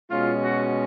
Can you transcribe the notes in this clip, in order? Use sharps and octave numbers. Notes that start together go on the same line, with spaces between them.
B2 G#3 C#4 F4
F#4